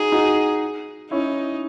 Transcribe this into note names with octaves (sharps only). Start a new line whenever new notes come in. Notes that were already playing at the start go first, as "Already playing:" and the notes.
Already playing: D#4 F#4 G#4
D#4 F#4
C#4 D#4 E4